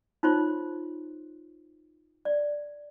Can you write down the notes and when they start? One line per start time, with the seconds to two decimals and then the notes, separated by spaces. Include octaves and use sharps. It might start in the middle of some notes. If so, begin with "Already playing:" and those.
0.23 D#4 F4 C5 C#5 C6
2.25 D5